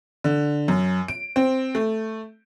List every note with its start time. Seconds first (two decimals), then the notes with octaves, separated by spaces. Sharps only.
0.24 D3
0.68 F#2
1.08 D7
1.36 C4
1.75 A3